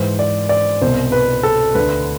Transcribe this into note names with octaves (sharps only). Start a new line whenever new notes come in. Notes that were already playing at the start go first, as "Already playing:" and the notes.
Already playing: G#2 E3 C5
D5
D5
C2 B2 C5
B4
A4
D2 D3 B4